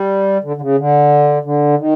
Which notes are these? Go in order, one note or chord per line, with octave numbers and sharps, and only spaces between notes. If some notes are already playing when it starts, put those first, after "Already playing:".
Already playing: G3
D3
D3
C#3
D3
D3
D#3